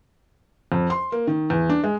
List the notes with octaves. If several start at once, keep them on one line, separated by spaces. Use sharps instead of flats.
F2
C6
A#3
D#3
E2
D4
G#3